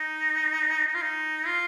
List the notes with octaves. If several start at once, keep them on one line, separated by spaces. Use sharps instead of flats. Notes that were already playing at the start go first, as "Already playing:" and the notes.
Already playing: D#4
D#4
F4
D#4
F4